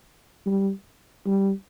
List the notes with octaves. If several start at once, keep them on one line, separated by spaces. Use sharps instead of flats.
G3
G3